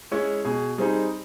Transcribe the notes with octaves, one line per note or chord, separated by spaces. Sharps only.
G#3 C#4 E4
B2 G#4
G3 C4 D#4 G#4